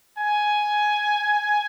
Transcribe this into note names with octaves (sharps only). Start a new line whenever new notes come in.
G#5